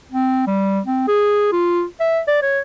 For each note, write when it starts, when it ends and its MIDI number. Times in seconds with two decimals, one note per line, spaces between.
0.11 0.43 60
0.47 0.80 55
0.85 1.07 60
1.08 1.50 68
1.52 1.84 65
2.00 2.20 76
2.28 2.41 74
2.42 2.60 73